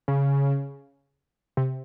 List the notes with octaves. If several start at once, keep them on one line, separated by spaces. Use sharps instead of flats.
C#3
C3